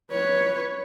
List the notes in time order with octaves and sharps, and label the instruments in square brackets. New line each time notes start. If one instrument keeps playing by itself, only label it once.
[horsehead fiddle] B4 C#5